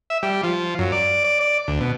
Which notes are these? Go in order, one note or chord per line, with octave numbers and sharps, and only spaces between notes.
E5
G3
F3
F#2
D5
D5
D5
D2
B2